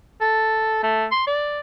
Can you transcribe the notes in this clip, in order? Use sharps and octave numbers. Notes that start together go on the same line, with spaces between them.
A4
A3
C6
D5